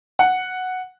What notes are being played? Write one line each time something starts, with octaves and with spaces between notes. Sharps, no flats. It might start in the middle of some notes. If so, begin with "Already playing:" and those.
F#5